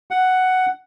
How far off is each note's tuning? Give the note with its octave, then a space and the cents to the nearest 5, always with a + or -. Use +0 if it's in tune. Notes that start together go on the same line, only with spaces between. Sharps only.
F#5 +5